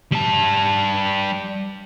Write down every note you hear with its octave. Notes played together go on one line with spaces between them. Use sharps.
G3 A5